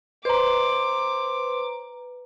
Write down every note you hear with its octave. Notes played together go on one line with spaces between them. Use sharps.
B4 C5 A#5 C6 D6